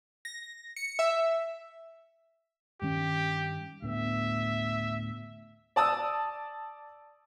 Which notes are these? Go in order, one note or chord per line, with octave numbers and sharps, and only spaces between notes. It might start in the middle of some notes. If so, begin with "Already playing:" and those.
A#6
C#7
E5
G2 D#3 C#4 G4
D2 A2 B3 E5
D5 A5 D#6 E6